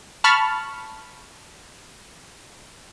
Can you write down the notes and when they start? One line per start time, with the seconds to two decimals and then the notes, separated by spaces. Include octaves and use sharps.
0.24 A5 B5 C#6 F6